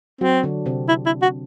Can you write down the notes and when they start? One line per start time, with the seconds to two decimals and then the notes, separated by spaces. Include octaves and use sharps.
0.21 F#3 C4 F#4
0.43 D3 D4
0.66 C3 C4
0.89 E4
1.06 E4
1.22 F#4